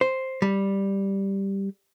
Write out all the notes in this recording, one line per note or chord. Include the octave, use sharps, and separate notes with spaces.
C5
G3